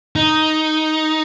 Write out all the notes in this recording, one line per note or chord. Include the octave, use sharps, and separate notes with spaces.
D#4